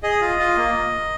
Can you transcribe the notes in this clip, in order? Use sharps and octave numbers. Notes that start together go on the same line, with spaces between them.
G#4 D#5
F4
F4
A#3